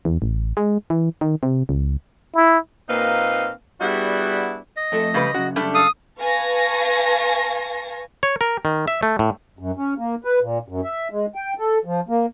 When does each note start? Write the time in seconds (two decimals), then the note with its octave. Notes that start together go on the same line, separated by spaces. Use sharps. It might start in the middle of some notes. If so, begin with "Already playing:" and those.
0.05 E2
0.22 A1
0.57 G#3
0.90 E3
1.21 D#3
1.43 C3
1.69 C#2
2.34 E4
2.89 A#2 A#3 C4 D#4 B4 F5
3.80 G3 B3 D4 E4 F#4 G#4
4.77 D#5
4.92 F2 A3 A4
5.14 C#3 G3 B4
5.34 F#2 C#3 F#4
5.56 G3 A3 D4
5.75 A4 F5 D#6
6.18 B4 F5 G#5 A5 C#6 A#6
8.23 C#5
8.41 A#4
8.65 D#3
8.88 E5
9.03 A3
9.19 A2
9.59 F#2
9.77 C#4
9.98 A#3
10.25 B4
10.42 A#2
10.68 F#2
10.84 E5
11.11 G#3
11.35 G5
11.59 A4
11.85 F3
12.09 A#3